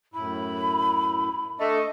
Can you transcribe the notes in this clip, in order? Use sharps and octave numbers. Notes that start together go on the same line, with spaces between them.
F#2 A2 E4 B5
A3 D4 D#5